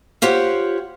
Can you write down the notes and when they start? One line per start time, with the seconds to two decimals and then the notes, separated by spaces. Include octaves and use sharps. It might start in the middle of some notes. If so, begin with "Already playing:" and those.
0.22 F4 G4 C5 C#5 F#5